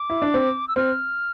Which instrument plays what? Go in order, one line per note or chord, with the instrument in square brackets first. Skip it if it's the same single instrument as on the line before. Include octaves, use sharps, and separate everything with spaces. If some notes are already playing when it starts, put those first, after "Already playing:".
Already playing: [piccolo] D6
[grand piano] E4
D4
C4
[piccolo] E6
[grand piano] C4 [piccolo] F6